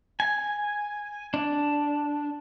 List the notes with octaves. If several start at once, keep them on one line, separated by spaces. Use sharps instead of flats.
G#5
D4